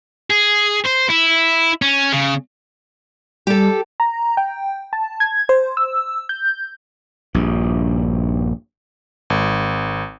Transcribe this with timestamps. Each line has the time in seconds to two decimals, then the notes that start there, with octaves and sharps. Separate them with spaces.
0.30 G#4
0.86 C5
1.10 E4
1.82 C#4
2.12 C#3
3.47 G3 G4 A4
4.00 A#5
4.37 G5
4.93 A5
5.20 G#6
5.49 C5
5.77 E6
6.29 G6
7.35 A#1 G2
9.30 G#1